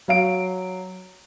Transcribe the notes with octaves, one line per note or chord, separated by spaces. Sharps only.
F#3 F5 D7